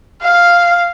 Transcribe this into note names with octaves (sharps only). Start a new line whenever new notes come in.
F5